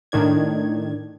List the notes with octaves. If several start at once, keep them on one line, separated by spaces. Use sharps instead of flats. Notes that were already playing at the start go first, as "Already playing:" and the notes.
A2 D#3 D4 G#6